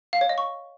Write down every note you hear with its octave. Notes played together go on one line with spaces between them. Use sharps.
F5
C#5
D#5
C#6